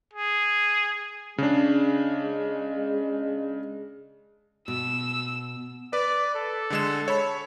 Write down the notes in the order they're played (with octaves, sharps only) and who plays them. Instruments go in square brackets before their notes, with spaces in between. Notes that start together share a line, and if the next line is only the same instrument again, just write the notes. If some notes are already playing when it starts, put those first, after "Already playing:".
[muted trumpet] G#4
[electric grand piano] C#3 D4 [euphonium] G#3
[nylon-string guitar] B2 [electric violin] E6
[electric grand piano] B4 [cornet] D5
[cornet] A4
[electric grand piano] D3 G#3 E7
C#5 B5